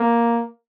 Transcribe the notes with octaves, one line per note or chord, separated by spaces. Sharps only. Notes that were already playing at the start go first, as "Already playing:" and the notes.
Already playing: A#3